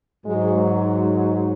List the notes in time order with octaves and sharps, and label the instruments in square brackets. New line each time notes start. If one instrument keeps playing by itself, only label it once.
[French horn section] G#2 F#3 G#3